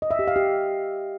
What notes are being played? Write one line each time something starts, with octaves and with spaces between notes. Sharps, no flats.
D#5
E5
G4
F5
G4